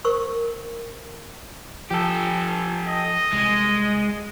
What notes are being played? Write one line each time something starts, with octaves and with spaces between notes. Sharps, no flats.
A#4 C5 C#6 E6
F3 G4 A4
D#5
C2 G#3